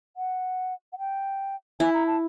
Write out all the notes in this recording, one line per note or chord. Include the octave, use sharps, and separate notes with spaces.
F#5
F#5
G5
E4 G#5
A#5
A5